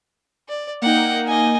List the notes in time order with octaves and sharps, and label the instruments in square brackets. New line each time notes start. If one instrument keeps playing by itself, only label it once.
[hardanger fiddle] D5
[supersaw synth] A#3 D#4 [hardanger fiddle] F#5 G5
[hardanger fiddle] D#5 G#5